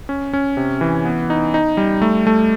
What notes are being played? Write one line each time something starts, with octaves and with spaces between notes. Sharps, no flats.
C#4
C#4
C3
E3
B3
D#4
D#4
G3
A3
A3